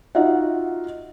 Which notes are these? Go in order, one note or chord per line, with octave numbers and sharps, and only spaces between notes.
D#4 F4 F#4 E5 F#5